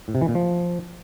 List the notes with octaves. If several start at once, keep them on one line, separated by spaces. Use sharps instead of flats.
A2
C3
E3
A#2
F3